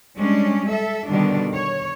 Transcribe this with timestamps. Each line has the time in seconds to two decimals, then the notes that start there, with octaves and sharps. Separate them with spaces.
0.17 G3 G#3 C#4 D4
0.67 A4 E5
1.08 B2 D3 D#3 G3 D4
1.53 C#5